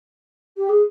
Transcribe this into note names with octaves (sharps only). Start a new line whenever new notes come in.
G4
G#4